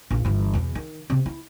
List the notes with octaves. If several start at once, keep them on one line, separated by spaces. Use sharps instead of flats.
A#1 F4
G1 E3
E2 B2
D#3
C3 C4
E4